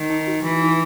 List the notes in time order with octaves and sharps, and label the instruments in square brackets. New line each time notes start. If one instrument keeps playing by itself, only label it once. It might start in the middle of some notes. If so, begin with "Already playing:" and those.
Already playing: [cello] D#3
[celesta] D#4
F#4
[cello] E3 [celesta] D#4
[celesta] D#4